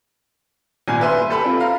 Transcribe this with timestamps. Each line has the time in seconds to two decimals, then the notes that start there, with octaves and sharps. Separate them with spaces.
0.88 G#1 A#2 G3 G#5
1.01 B4 E5 C6
1.29 G4 A4 B5
1.45 C4 F4
1.60 F5 A#5